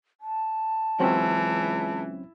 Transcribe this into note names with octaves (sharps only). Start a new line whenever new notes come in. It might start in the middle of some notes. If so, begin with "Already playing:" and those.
A5
C#2 E3 F#3 C4 C#4